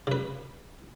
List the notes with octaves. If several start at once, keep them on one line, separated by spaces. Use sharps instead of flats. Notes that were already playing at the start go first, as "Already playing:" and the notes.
C#3 B4